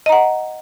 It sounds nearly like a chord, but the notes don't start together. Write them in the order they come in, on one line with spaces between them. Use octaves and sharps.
D#5 A#5 F#5